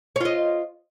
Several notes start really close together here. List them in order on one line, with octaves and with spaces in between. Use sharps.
C#5 F4 D#5